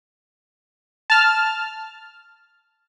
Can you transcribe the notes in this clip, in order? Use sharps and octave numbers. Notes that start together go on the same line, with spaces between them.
A5 F6